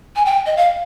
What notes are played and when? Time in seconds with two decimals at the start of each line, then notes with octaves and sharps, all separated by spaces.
0.16 G#5
0.25 G5
0.46 D#5
0.57 F5